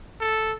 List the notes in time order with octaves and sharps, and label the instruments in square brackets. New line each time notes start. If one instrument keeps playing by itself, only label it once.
[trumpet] A4